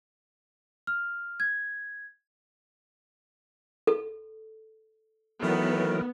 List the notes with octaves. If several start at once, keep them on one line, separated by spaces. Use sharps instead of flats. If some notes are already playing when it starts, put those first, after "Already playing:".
F6
G#6
A4
D#3 E3 F#3 A3 B3 A#4